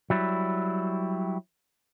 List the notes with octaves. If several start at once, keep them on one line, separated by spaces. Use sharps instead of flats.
F#3 G3 E4